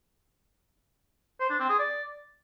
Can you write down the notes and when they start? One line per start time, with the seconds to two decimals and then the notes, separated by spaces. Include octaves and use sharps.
1.40 C5
1.50 D4
1.59 C4
1.69 G#4
1.79 D5